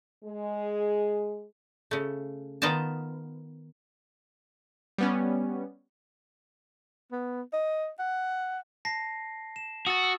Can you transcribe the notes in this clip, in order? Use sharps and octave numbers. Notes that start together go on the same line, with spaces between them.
G#3 G#4
C#3 A3
D#3 B3 F4 D#5 G5 A5
G3 B3 C#4
B3
D#5
F#5
A5 A#6 C7
E7
F#4 D#6 E6 A6
E6